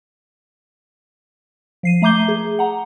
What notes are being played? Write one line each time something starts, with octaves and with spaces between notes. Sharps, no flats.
F3 C7 D#7
A3 E5 A#5 D6 G6 G7
G#4
F#5 A#5